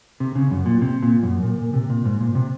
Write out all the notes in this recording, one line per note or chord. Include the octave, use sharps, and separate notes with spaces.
C3
C#3
F#2
A#2
C3
A#2
F#2
A#2
A#2
C3
A#2
G#2
A#2
C3